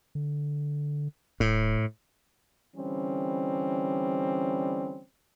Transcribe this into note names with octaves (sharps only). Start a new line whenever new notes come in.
D3
D1 A2
D3 E3 G3 C4 C#4